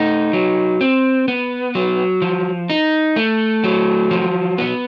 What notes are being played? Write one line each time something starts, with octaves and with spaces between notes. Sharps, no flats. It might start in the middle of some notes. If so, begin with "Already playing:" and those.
Already playing: A3 D#4
F#3
C4
B3
F#3
F3
D#4
A3
F#3
F3
B3